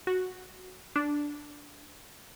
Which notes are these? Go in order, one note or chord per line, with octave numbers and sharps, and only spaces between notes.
F#4
D4